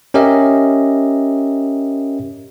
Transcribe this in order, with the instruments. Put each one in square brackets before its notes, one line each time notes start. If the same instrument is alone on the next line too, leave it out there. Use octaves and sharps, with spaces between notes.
[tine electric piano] C#4 G4 A#4 D#5 E5